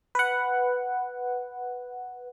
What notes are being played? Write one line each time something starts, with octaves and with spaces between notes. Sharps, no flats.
B4 F#5